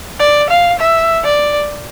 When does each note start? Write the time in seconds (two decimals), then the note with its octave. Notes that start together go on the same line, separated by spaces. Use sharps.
0.20 D5
0.50 F5
0.80 E5
1.25 D5